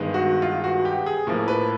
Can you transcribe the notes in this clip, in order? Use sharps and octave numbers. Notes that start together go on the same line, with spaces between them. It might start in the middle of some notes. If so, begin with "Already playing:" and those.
Already playing: G2 D#3 G#3 B3
F#4
F4
F#4
G4
G#4
A2 F3 A#3
B4